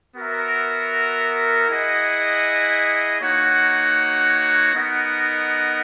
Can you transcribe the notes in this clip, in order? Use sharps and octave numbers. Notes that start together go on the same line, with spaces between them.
B3 F#4 A#4 E5
E4 G#4 D#5 F#5
A#3 D#4 F#4 C#5 F#5
B3 D#4 A#4 D#5 F#5